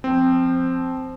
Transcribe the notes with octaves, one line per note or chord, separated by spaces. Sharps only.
F3 C4